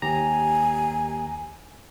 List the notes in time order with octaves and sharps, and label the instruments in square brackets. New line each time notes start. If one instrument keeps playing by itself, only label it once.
[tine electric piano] D#2 G4 A#5 [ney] G#5